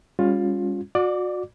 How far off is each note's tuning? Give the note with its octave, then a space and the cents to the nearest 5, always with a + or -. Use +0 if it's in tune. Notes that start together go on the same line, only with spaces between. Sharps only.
G3 +45 C#4 +0 F4 +20
F#4 -35 D5 +20 D6 -15